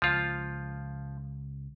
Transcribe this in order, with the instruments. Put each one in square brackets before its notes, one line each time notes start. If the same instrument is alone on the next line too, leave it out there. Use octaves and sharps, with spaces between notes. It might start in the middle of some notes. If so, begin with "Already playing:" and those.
[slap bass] C#2 [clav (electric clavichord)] F3 F4